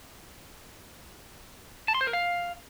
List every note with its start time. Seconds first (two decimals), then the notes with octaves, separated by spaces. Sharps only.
1.88 A5
1.94 C6
2.01 C5
2.07 A#4
2.13 F5